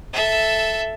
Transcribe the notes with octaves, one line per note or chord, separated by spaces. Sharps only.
A4 E5